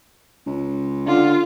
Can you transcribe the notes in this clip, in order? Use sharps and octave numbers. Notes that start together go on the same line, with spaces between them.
C#2
D3 F4